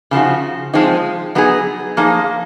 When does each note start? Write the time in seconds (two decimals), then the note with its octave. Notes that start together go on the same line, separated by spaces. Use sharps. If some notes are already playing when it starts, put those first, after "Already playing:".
0.11 C#3 F3 A#3 D#4 F#4
0.74 F3 G#3 C4 D#4
1.35 F#3 B3 D#4 G#4
1.97 F3 A#3 D#4 G#4